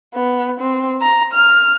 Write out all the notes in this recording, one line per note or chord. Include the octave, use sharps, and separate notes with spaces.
B3
C4
A#5
F6